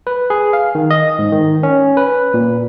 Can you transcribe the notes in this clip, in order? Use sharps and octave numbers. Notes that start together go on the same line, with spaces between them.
B4
G#4
F5
D#3
D#5
G#2
D#3
C#4
B4
A#2